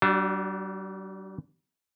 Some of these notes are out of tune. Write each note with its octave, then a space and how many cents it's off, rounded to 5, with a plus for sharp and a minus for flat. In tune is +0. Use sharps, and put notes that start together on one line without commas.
G3 -40 D4 +0 F#4 +0